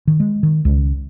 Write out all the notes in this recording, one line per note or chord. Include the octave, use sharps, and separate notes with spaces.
D#3
G#3
D#3
C#2